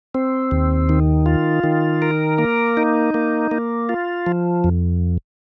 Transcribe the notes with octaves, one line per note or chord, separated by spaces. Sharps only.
C4
D#2
D#3
F4
D#3
A#4
A#3
D#4
A#3
A#3
F4
F3
F2